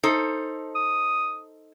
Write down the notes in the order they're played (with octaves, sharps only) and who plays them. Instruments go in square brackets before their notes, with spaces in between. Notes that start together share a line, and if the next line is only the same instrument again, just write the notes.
[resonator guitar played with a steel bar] D#4 A4 C5
[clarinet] D#6